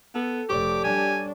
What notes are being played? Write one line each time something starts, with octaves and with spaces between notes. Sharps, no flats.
B3 A4
F1 G4 C#5 D5 D6
G3 D4 G#5